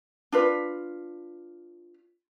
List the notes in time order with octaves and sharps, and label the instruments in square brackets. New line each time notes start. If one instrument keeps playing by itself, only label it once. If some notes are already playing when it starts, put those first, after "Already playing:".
[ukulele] D4 F4 B4